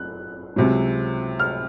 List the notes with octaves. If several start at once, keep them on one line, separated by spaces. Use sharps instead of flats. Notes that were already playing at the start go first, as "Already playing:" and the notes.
Already playing: F#1 F2 F#6
C#2 C3 F#3
F6